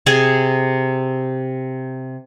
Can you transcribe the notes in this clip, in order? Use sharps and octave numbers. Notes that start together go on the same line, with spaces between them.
C3 G#4 G#5